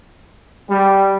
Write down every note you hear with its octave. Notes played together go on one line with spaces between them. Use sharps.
G3